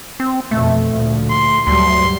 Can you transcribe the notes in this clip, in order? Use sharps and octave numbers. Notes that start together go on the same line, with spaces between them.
C4
F2 B2 A3
D2 A#2 F3
C6
D2 G2 F#3 G3 C6